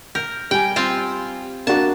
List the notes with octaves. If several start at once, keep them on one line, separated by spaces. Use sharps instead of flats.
A#4 G6
G3 G5 G#5
C4 F4
A#3 D4 F#4 A5